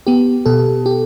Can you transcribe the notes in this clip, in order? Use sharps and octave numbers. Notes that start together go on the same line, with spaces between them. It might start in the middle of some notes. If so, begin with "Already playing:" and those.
B3 G4
B2 A4
G4